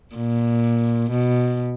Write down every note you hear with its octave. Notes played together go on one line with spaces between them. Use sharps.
A#2
B2